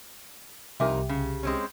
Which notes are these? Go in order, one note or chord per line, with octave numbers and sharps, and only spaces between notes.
C2 F2 D#4 G4 A#4 E5 G#5 D6
C#3
G#3 C4 C#4